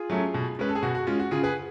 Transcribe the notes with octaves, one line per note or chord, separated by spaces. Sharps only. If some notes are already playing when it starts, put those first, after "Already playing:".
Already playing: F4 G#4
F#3 A3 C#4
B2
G#3 C#4 B4
A4
G#4
B2 F#4
F#4
G#3 C#4 F4
F#4
C#3 F4 G#4
G#4 B4